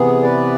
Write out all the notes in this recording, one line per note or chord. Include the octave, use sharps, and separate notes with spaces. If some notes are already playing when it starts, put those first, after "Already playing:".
Already playing: C3 E3 B3 G#4
B4 D5